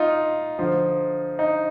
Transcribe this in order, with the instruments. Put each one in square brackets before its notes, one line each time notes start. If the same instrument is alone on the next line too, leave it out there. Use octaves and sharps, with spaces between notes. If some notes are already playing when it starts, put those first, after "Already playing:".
Already playing: [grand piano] D#4 F4
D3 F3
D#4